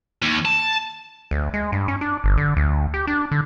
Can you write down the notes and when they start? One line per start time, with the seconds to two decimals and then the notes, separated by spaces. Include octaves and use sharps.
0.22 D#2
0.45 A5
1.31 D2
1.54 G#3
1.72 G2
1.88 C#4
2.01 D4
2.24 G1
2.38 D3
2.57 D2
2.94 G4
3.07 D4
3.31 D3